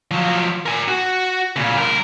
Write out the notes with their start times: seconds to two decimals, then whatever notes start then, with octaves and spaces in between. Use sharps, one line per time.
0.11 F3 F#3
0.66 A#4 G#5
0.88 F#4
1.56 A#2 C#3
1.77 G2 A#4